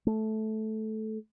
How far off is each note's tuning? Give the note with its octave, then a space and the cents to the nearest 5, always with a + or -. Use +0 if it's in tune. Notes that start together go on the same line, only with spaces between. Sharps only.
A3 -15